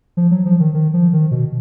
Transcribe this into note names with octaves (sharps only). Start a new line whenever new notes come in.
F3
F#3
F3
D#3
D#3
F3
D#3
B2